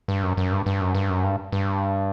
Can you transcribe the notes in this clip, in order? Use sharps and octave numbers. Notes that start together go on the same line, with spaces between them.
G2
F#2
F#2
G2
G2
F#2
G2
F#2
G2
G2